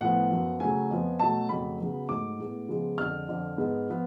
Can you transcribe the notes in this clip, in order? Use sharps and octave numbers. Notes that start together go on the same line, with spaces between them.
A2 F3 B3 F#5
F#2 F3 B3
C#3 F#3 A3 G#5
F2 F3 B3
B2 F#3 A3 A5
F2 C#3 F#3 A3 B5
C#3 F#3 B3
G#2 F#3 A3 D6
A2 G#3 B3
C#3 F3 G#3 B3
F2 D3 G#3 F6
F2 D3 F3
G#2 G#3 B3
F3 B3